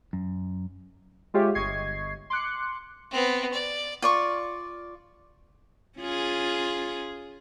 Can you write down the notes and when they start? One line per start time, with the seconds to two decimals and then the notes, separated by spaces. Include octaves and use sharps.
0.13 F#2
1.34 G#3 F4 G4 C#5 E5
1.55 G1 D#5 C#6 G#6 C7
2.30 C6 D6 F#6 C#7
3.11 B3 C4
3.53 D5
4.02 F4 D5 C#6
5.98 C#4 F4 G#4